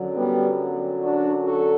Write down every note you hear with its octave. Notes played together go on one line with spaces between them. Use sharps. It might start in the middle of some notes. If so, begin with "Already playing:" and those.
Already playing: F#2 D3 F#3
G3 B3
D4 F#4
F#4 A4